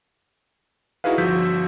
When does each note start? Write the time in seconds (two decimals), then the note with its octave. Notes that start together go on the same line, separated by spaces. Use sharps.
1.04 D#4 E4 F#4 G#4 B4 F5
1.18 G1 F3 F#4 E6 G6 B6